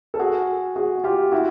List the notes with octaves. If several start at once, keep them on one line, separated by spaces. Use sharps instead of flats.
A4
F#4 G#4
F#4 G#4
F4 G4
E4 F#4